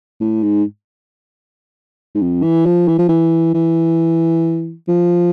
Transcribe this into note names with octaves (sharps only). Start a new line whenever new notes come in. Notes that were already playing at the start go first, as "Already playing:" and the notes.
A2
G#2
G#2
F2
E3
F3
E3
F3
E3
E3
F3